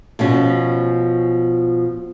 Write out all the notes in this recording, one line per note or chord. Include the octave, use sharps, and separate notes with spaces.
B2 F3 C#4